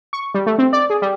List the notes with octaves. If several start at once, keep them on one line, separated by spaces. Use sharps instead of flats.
C#6
G3
A3
C4
D5
G#4
G3